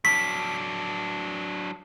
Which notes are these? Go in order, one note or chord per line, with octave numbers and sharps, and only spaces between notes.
F#3 D4 B6